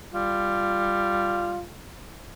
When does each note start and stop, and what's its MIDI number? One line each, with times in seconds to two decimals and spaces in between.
0.14 1.70 55
0.14 1.62 65